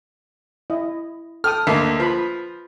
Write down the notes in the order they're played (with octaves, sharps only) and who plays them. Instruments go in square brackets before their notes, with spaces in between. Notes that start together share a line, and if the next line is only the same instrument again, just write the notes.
[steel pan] E4 D#5
[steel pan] A4 G5 D#6 [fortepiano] F6
[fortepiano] D2 A#3 [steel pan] D#5 E5
[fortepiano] F3 [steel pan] B4 B5